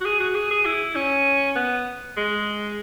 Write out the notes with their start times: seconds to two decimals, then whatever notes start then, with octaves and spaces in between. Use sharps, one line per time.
0.01 F#4
0.05 G#4
0.20 F#4
0.35 G#4
0.51 G#4
0.65 E4
0.95 C#4
1.55 B3
2.17 G#3